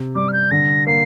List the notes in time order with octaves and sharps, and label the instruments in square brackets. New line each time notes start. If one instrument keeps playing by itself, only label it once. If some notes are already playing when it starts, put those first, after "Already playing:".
Already playing: [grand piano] C3
[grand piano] G3 [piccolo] D6
[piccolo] F6
G6
[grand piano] D3 [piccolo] A#6
[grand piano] A#3 [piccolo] C7